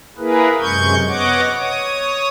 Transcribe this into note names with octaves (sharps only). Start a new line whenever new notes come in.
A#3 E4 G#4 A#4 B4
F#2 C3 G#3 C#6 G6 G#6
B3 C#5 D#5 F#5 D6
C#5 D#6